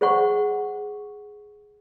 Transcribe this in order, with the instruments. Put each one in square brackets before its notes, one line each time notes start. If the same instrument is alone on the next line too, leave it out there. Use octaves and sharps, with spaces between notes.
[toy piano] G#4 C5 F#5 C#6